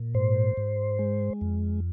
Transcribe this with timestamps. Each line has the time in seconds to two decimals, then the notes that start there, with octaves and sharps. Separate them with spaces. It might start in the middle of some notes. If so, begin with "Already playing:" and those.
Already playing: A#2
0.14 G#2 C5
0.57 G#2
0.99 G#3
1.41 F2